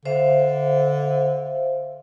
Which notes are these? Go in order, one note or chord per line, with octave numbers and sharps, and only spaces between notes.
D3 C5 E5 F5